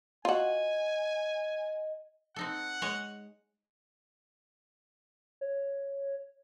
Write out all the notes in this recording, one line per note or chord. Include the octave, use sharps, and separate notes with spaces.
F4 F#4 D#5 G#5
C4 D#4 A4 F#5
G#3 C#5 D#5
C#5